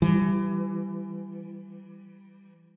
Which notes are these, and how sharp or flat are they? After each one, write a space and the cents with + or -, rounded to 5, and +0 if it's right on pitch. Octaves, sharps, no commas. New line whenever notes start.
E3 +30 G3 +0